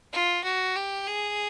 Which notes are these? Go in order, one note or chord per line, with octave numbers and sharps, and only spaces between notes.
F4
F#4
G4
G#4